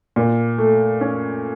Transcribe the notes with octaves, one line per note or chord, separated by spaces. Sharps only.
A#2
A3
C#4